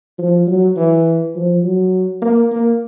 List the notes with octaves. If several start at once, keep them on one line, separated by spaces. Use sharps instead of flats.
F3
F#3
E3
F3
F#3
A#3
A#3